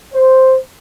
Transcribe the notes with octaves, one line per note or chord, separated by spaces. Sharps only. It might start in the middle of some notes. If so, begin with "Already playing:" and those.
C5